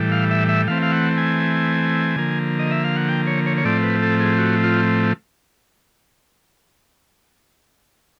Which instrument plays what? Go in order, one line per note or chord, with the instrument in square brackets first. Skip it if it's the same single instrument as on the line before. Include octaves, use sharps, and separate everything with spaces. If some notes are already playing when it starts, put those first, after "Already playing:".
Already playing: [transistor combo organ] A2 E3 G3
F5
E5
E5
E3 A3 C4 F5
F5
F#5
G#5
D3 F3 A#3
D#5
E5
F5
F#5
G5
C#5
C#5
C#5
A2 F3 A3 C4 D5
B4
A4
G#4
F#4
F4